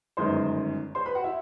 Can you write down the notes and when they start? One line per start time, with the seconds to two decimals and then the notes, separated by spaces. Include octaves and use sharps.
0.17 G1 F#2 D#3 G#3 C5 C6
0.95 C5 C6
1.06 B4 B5
1.15 F#4 F#5
1.24 E4 E5